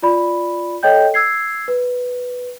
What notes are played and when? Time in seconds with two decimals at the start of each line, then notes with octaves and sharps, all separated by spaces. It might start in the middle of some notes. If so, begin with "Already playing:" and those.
0.02 F4 D5 B5
0.83 A4 C#5 D#5 G5 G6
1.14 E6 G#6 C7
1.68 B4